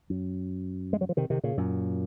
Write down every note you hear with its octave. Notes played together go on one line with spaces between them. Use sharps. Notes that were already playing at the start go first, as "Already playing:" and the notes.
F#2
G#3
F#3
F3
C3 D#3
C3 D#3
A#2 C#3
F#2 A#2